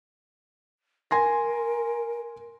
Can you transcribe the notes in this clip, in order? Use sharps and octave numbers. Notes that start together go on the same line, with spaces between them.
A#4 G#5 C6 A#6